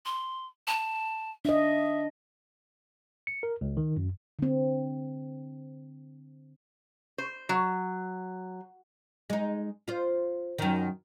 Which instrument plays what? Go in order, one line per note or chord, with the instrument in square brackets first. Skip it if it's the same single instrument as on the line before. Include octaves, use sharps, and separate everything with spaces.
[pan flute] C6
A5
[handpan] D4 D#5 [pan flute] E5
[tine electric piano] C#7
A#4
C#2
D#3
F#2
[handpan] D3 C4
[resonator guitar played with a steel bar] C5
F#3
[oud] G#3 D#4
F4 C5
F#2 D#3